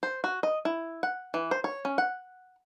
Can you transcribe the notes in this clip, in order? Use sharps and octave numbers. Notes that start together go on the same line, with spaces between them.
C5
F#4
D#5
E4
F#5
E3
C5
C#5
C#4
F#5